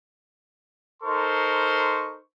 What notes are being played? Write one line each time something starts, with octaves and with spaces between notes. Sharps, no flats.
D#4 A4 A#4 C5 C6 C#6